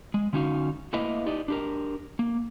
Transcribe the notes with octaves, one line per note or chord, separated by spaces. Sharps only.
G#3
D3 C#4 D#4 F#4 F5
A3 A#3 E4 B4 D#5 F5
D#4 G4 D5 D#5
D4 G4 A#4
A#3